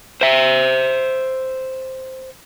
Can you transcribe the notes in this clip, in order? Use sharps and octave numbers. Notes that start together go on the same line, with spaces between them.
C5 E5